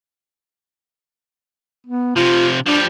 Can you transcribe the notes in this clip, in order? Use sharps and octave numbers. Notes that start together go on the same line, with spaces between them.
B3
C3 F3 F4
F3 G3 D4